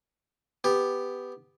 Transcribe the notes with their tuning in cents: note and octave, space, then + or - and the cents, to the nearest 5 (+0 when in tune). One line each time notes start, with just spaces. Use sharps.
B3 +10 G4 +10